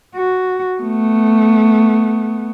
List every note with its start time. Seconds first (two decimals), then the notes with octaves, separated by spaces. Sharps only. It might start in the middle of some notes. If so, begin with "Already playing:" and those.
0.15 F#4
0.81 A3 B3